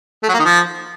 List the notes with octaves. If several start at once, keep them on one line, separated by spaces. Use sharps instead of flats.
A3
F#3
A#3
D#3
F3